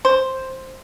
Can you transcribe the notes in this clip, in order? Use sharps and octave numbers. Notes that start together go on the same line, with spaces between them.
C5